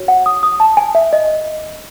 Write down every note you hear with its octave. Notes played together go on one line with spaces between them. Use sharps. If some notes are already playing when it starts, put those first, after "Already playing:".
Already playing: F#4 C#5
F#5
D#6
D#6
A5
G#5
E5
D#5